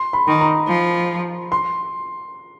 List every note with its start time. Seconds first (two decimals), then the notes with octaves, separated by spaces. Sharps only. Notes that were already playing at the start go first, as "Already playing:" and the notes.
Already playing: C6
0.13 B5
0.28 D#3
0.41 A#5
0.68 F3
1.52 C6